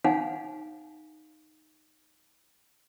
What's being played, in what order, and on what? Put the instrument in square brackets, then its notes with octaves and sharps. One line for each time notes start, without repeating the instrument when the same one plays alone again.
[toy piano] D#4 F5 F#5 G#5